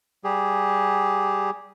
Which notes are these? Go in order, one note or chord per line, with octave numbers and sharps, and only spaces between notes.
G3 G4 G#4